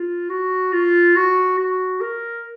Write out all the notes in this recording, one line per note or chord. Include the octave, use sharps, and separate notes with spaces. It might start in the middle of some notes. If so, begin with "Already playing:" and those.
Already playing: F4
F#4
F4
F#4
F#4
A#4